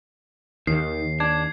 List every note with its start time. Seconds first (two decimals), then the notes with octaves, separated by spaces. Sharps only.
0.67 D#2 D#3 C7
1.20 D4 G#6